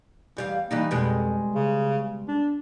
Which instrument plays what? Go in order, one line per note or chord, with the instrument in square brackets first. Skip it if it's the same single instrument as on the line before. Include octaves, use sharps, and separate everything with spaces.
[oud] E2 G3 F5
[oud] E3 G3 D#4 [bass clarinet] A#3
[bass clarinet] F2 [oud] B2 G3 G#3
[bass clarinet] C#3
D4